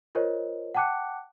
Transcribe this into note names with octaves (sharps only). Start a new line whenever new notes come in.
F4 A#4 C5 C#5 D#5
F#5 G5 A5 D6 F#6 C#7